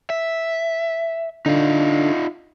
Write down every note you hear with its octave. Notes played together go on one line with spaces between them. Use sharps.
E5
D3 D#4 F4